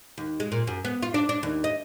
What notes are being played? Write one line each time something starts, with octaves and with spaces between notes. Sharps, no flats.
D#2
G#3
A#2
F#2
B3
F4
D4
D4
D#2
D#5